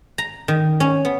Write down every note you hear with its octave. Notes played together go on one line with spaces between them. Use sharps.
A#5
D#3
C#4
B3